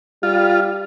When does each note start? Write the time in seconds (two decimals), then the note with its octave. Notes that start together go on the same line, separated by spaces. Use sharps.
0.23 G3 F4